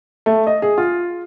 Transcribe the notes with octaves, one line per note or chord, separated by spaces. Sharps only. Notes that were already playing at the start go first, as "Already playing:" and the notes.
A3
D#5
G#4
F4